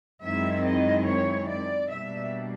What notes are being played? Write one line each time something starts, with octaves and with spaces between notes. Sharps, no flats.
F#2 D#3 G#3 C4 E4 E5
D#5
C#5
D5
B2 G3 A#3 D4 E5